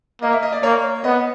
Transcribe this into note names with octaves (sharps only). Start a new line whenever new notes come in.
A#3 D#5
E5
D#5
D5
A#3 C#5
B3 D#5